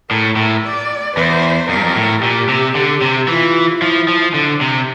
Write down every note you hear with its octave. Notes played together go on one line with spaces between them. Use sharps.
A2 A#4
A2
D5
E2 C5
F2 A#4
G2
F2
A2
A#2 G4
C3
D3
C3
E3 F4
F3 E4
F3
D3 D4
C3